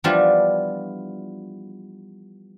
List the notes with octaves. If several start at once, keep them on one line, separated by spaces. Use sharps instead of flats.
E3 F3 G3 B3 D4 F4